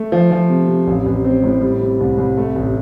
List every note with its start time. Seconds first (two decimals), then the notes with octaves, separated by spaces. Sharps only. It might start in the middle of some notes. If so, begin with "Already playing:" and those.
Already playing: A3
0.12 F3
0.31 F3
0.50 C3
0.68 C3
0.87 A1
1.06 A1
1.24 C4
1.43 A2
1.62 G3
1.81 C3
2.00 C2
2.18 C2
2.37 A3
2.56 A1